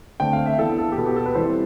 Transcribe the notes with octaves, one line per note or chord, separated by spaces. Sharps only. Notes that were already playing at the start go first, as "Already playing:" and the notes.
D3 A3 C4 G5
F5
E5
E3 B3 A4
A4
G4
B2 B3 A4
G4
A4
B4
E3 G3 C4 C5